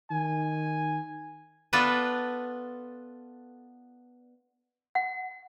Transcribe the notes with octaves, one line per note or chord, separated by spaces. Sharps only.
D#3 G#5
B3 D4 F4 A4 B4
F#5